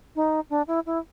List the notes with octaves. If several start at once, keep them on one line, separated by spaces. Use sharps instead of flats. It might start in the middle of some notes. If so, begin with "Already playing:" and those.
D#4
D4
E4
E4